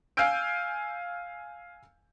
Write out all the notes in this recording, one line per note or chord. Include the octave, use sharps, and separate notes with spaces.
F5 G#5 E6 F6 G6 D7